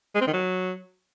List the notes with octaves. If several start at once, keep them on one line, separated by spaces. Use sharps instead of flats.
G#3
C4
D#3
F#3